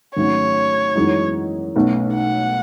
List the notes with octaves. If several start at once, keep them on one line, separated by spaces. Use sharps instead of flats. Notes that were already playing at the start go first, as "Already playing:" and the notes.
G#1 G#2 F#3 A3 C#4 C#5
F#2 E3 G#3 D#4 F#4
B1 B2 A3 C#4
F#5